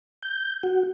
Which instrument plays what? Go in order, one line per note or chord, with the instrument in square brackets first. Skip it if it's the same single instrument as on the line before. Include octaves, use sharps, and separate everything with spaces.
[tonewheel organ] G6
F#4